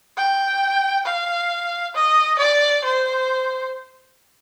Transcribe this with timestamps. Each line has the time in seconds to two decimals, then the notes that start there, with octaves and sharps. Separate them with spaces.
0.17 G5
1.06 F5
1.94 D#5
2.39 D5
2.84 C5